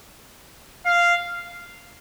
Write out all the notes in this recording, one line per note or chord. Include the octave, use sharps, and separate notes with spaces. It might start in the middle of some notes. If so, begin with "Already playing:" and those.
F5